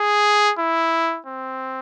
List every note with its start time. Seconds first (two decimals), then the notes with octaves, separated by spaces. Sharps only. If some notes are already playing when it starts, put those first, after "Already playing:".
Already playing: G#4
0.59 E4
1.27 C4